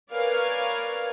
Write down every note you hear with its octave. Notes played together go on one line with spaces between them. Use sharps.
A#4 B4 C#5 D5 F5 G#5